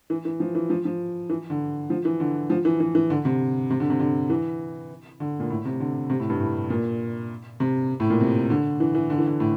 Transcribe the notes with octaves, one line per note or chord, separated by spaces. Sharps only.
E3
E3
F3
E3
F3
F3
E3
D3
F3
E3
D3
F3
E3
E3
E3
D3
C3
C3
D3
C3
D3
E3
D3
A#2
A2
C3
D3
C3
A2
G2
A2
A#2
C3
A2
A#2
C3
D3
E3
E3
D3
E3
D3
A2